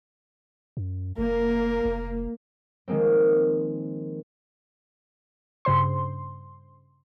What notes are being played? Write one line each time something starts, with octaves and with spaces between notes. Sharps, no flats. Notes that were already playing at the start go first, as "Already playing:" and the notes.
F#2
F1 A#3 A#4
F1
D#3 F3 G#3 A#3 C4
G2 C#3 C5 C6